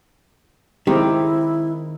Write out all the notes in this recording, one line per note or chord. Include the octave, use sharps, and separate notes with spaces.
D#3 G#3 C4 E4 G4